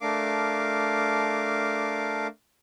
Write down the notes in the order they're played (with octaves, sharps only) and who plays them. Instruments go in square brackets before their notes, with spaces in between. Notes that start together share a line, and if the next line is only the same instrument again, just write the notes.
[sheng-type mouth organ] A3 D4 A#4 F5 D6